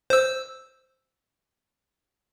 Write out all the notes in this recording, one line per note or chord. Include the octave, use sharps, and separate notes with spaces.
C5 E6